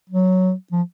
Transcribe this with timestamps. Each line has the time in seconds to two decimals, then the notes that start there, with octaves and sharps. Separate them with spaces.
0.10 F#3
0.72 F3